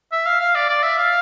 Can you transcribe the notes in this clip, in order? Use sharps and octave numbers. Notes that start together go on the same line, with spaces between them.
E5
F5
F5
D5
D5
E5
F5